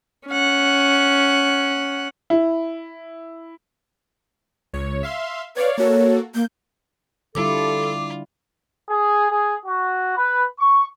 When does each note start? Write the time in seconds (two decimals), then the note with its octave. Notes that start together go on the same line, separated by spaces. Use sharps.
0.27 C#4 F#5
2.30 E4
4.73 C#2 C#5
5.03 E5 F5 C6
5.57 B4 C#5 D5 F5
5.78 A#3 F#4 A4 C#5
6.35 A#3 G6
7.35 D3 G3 E4 F4 A4 D6
8.89 G#4
9.32 G#4
9.66 F#4
10.17 B4
10.60 C#6